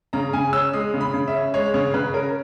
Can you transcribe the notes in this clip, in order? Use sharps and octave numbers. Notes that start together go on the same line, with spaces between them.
C#3 A#5
C#3 G#5
C#4 E6
G#3 D#6
C#3
B5
C#3
E5
C#4
G#3 C#5
C#3 C#5
C#3 B4
C#4 A#4